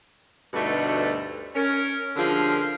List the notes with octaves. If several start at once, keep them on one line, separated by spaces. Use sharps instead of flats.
D2 G2 B2 A3 D#4 D5
C#4 A#4
D3 F3 G3 F4 G#4 A#4